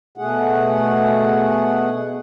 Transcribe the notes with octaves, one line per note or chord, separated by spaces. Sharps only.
B2 A3 G#4 F#5